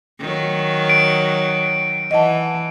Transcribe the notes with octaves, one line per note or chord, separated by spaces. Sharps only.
D#3 F#3
D7
E3 D#5 F#5 A5